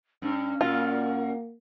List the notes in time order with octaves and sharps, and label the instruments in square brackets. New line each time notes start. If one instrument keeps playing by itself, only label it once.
[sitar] G2 [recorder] C#4
[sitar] A#2 F#4 [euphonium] A#3 [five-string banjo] F4